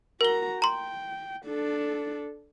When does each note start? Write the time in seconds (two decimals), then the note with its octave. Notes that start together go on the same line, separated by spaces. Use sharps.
0.21 F#4 A#4 A#5 G7
0.62 G5 A#5 C6
1.46 D4 A4